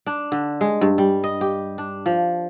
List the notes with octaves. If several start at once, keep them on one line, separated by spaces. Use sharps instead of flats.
D4
D3
G#3
G2
G3
D#5
G4
D4
F3